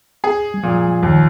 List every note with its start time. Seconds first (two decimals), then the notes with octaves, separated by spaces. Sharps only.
0.24 G#4
0.54 G3
0.63 A#2 F3
1.03 D#2 D#3